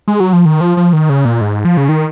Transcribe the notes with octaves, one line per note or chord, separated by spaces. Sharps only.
G#3
F#3
F3
D#3
F3
F3
D#3
C#3
A#2
G#2
F3
C#3
D#3